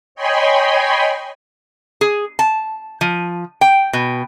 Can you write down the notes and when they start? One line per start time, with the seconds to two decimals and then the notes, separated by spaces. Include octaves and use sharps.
0.15 C#5 D#5 G5 G#5 B5 C6
2.01 G#4
2.39 A5
3.01 F3
3.61 G5
3.93 B2